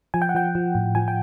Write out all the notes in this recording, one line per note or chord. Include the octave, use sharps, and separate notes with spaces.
F3 G#5
G5
F#5
F3 G5
F3
A2
F3 G#5
G5